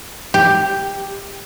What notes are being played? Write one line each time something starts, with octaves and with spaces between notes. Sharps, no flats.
G4